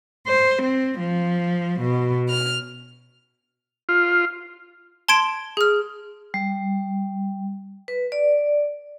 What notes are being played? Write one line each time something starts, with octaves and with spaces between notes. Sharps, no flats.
C5
C4
F3
B2
F6
F4
A5 C6 G#6 D7
G#4 F6
G3
B4
D5